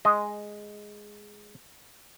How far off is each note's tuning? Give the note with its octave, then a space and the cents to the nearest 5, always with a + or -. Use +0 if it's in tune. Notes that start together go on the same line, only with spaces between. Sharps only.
G#3 +0 D#5 +0